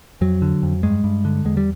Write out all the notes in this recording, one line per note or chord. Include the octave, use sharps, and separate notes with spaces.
F2 F#3
D3
F2
G2 G#3
G2
D3
E2 G#3
G3